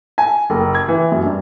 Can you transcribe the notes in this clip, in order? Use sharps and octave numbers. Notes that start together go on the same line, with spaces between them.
G#5
F#1
G#6
E3
F#2
G2